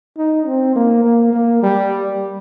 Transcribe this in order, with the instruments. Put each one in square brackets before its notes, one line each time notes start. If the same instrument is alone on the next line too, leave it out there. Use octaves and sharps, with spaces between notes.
[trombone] D#4
C4
A#3
A#3
A#3
G3